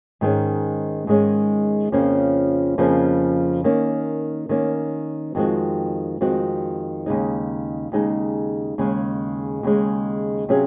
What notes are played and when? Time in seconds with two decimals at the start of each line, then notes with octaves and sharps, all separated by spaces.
0.21 G#2 D#3 G#3 C#4
1.07 G#2 D#3 G#3 C#4
1.92 F2 C#3 F3 A#3 C#4
2.78 F2 C#3 F3 A#3 C#4
3.64 D#3 A#3 C#4
4.49 D#3 A#3 C#4
5.35 F2 D#3 G#3 C4 F#4
6.21 F2 D#3 G#3 C4 F#4
7.06 D#2 C#3 G#3 D#4
7.92 D#2 C#3 G#3 D#4
8.78 D#2 C#3 G#3
9.63 D#2 C#3 G#3
10.49 C3 F#3 C#4 F4 G#4